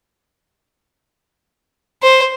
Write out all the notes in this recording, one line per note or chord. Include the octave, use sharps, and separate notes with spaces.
C5